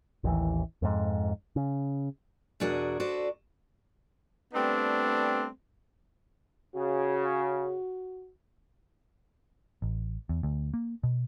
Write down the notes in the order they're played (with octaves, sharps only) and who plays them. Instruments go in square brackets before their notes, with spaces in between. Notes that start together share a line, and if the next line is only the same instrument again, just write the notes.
[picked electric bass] A1 D#2 E3
F2 G#2
C#3
[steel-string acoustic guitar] E2 B2 D4 F#4 G#4 A#4
F#4 A4 B4 C5 D5
[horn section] G3 A3 B3 C4 D4
[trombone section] C#3 [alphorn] F#4
[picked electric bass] A1
E2
D2
A#3
B2